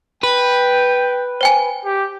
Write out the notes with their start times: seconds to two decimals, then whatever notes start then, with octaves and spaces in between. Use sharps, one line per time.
0.23 B4 G5
1.41 C5 G5 G#5
1.85 G4